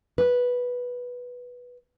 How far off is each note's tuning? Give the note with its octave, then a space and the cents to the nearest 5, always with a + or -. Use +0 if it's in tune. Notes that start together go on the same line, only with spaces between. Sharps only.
B4 -5